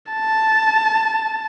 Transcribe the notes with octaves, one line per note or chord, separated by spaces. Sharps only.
A5